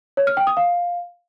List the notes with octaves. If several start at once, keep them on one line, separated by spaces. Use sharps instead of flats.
C#5
F6
G5
D#6
F5